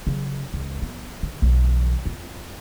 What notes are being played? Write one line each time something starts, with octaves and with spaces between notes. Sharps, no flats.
C#3 F#3
C#2
F3 B3
D3
B1 E3
F2